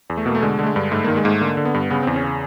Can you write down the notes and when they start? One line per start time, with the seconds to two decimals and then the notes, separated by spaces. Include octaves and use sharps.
0.10 E2
0.17 A3
0.26 B2 A#3
0.35 A3
0.42 D3 G#3
0.59 D3 A3
0.66 G#3
0.76 G2
0.91 G#2 A3
1.04 D#3 A#3
1.17 G#3
1.24 G#2 A3 A#3
1.41 D3 A#3
1.57 D3
1.65 B3
1.74 G2
1.90 C#3 B3
2.03 E2 C4
2.16 C#4
2.24 C#3